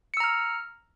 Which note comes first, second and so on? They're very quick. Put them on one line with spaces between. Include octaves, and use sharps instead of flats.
C#7 E6 A#5 F6